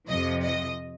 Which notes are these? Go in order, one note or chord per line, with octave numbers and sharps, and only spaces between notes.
F2 C3 F3 D#5
D#5